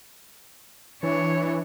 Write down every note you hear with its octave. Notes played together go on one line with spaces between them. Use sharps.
E3 D4 C#5